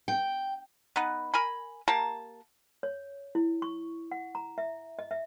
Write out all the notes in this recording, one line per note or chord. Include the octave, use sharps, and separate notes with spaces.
G5
B3 D#4 B4
A#4 G#5 B5
A#3 G4 A#4 A5
C#5
E4
C#6
F#5
A#5
E5
D#5
E5